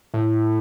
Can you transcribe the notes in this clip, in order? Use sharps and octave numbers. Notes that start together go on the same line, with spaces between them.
A2